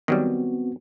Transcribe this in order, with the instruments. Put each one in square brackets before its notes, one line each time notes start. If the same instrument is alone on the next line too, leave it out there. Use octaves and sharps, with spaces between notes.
[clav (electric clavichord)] D#3 F#3 G3 [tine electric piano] B3 C4 F#4